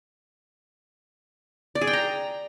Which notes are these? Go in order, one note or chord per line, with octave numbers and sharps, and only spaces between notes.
D5
G#4
G5
A#5